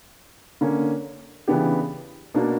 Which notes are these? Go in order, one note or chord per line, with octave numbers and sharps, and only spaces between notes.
D3 A#3 C#4
C#3 E3 B3 D4 G4
B2 A#3 D4 F#4